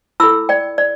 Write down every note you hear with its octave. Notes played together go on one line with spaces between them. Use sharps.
E4 A4 B5 E6
D5 G5
D5